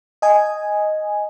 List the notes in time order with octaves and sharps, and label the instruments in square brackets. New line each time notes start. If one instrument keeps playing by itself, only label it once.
[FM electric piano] D#5 G#5